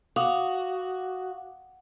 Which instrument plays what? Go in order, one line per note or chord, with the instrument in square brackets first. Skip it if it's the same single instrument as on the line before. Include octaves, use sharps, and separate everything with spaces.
[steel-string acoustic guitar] F#4 [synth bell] F5 D6 D#6